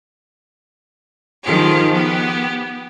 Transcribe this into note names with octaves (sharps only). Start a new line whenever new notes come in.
D#3 F3 F4 G4 G#4
B3 G4